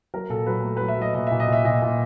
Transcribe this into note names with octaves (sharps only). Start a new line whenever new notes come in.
F#3 A#4
A#2 A4
F#3 B4
A3
F#3 B4
E5
F#3 D#5
A#2 D#5
A#2 E5
D#5
A#2 E5
A#2 D#5
A#2